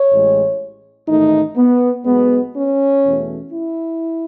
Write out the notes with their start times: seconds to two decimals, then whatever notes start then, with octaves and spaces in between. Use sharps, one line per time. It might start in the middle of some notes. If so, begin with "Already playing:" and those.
Already playing: C#5
0.09 A1 A2 G#3
1.07 A1 G#2 D#3 A3 D#4
1.57 B3
2.05 B1 B2 G#3 B3
2.55 C#4
3.04 E2 B2 A3
3.53 E4